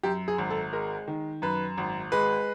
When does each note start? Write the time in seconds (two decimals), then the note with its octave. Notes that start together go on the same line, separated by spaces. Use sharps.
0.03 F#2 G4
0.28 G#4
0.38 G#1
0.50 A4
0.73 G#3 A#4
1.08 D#3
1.42 F#2 B4
1.78 G#1
2.12 G#3 B4